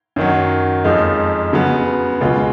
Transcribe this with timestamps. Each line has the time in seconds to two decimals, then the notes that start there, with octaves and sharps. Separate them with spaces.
0.16 F#2 D#3 F#3
0.84 F2 F3 G#3 D#4
1.53 C#3 F#3 B3
2.21 C#2 B2 G#3 C#4 F4